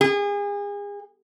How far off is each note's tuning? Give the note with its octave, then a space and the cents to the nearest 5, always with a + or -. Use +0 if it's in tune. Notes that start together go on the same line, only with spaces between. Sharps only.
G#4 -35